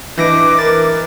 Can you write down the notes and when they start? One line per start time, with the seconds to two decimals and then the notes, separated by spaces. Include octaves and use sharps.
0.17 E3 D4 D#5 D6 A#6 D7
0.59 A#4 A6